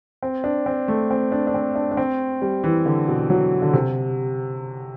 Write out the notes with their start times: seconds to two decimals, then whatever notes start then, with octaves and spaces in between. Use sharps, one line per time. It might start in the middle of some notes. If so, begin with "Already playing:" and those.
0.23 C4
0.44 D4
0.66 C4
0.88 A3
1.11 C4
1.32 D4
1.47 D4
1.54 C4
1.75 D4
1.92 D4
1.97 C4
2.42 G3
2.64 E3
2.86 D3
3.08 B2
3.30 F#3
3.62 D3
3.73 C3